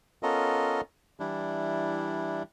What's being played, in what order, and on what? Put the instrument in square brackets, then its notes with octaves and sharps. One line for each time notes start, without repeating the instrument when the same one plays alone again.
[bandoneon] B3 C#4 F4 A4 A#4 D#5
E3 G3 D4 E4